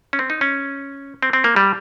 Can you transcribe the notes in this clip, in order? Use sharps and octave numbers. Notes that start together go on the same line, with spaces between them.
C#4
C4
D#4
C#4
C4
C4
A#3
G3